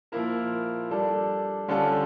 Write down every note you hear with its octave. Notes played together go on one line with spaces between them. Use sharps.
A#2 F3 A#3 E4 A#4
G3 D4 A4
D3 G3 C#4 F4 A4